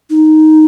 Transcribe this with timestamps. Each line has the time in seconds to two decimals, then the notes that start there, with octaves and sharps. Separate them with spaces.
0.10 D#4